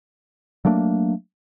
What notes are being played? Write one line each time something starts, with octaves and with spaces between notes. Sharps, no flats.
F#3 A3 A#3 D4